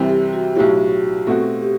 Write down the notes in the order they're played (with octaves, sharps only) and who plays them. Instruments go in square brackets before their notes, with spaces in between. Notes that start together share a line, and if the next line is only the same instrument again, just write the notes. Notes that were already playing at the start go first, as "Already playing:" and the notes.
Already playing: [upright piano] C2 C3 E3 G3 C4
[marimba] G4
F#4
[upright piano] B1 A2 F#3 [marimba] G4
[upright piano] B2 A3 C4 F#4 [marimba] A4
[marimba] G4